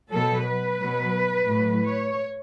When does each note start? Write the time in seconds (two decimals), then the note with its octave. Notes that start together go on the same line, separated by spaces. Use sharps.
0.11 B2 F#3 A4
0.46 B4
0.80 B2 F#3
1.49 A2 F#3
1.83 C#5